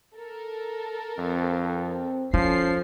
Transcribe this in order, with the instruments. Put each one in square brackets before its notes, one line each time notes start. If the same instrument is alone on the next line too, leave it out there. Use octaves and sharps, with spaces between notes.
[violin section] A4 A#4
[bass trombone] F2 [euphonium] C4
[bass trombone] F3 [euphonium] C#4 [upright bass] E4 [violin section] A4 C7